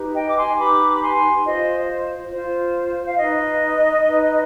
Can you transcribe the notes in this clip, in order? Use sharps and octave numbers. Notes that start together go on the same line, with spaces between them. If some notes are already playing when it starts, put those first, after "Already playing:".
Already playing: D#4 G4 B4
D#5 G5
D6
G#5 C6
D#4 G4 B4 B5 D6
B5
G#5 C6
F4 C5 D#5
F4 C5
F5
D#4 B4 D#5
D#4 B4